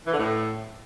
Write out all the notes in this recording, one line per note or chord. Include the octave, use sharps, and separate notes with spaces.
E3
D3
A2